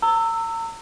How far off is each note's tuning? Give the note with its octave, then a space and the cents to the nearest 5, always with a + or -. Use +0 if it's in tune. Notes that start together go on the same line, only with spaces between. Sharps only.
A#5 -40 E6 +0